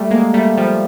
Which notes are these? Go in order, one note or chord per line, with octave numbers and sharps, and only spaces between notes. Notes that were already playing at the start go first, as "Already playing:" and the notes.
Already playing: G3 A3
G#3 A#3
G3 A3
F3 G3